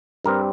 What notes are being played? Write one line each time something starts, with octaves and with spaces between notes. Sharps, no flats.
G2 G3 C4 A#4